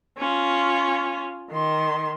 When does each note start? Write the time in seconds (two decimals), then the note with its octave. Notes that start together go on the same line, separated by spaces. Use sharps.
0.18 C#4 F4
1.51 D#3 C6